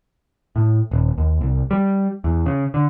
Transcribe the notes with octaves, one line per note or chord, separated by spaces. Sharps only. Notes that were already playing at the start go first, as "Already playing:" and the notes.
A2
D#1
D#2
C2
G3
E2
C#3
D3